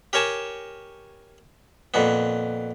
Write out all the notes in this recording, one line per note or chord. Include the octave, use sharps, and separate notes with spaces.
G4 A#4 C#5 G#5 A5
F2 A#2 B3